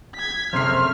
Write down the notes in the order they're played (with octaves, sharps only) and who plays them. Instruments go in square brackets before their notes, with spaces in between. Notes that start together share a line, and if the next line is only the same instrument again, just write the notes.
[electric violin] G#6 B6
[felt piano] F#1 C3 C7 [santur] A3 C5 [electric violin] F6